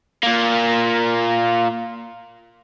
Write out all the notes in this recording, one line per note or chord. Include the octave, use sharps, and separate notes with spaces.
A#2 A#3